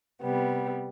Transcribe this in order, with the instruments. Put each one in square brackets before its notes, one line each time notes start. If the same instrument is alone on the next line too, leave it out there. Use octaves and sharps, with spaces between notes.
[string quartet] C3 G3 B3